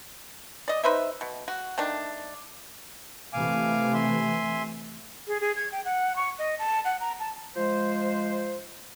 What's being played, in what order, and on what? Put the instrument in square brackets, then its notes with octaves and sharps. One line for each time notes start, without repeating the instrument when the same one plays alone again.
[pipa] D5 D#5
D#4 B4 C5 E5
B2
F#4
D#3 A3 D4
[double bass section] C3 E3 A3 [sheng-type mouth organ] F5 G#5 D6
[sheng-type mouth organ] E5 G#5 C6
[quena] G#4
G#4
G#6
G5
F#5
C#6
D#5
A5
F#5
A#5
A5
[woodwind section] F3 G#3 C5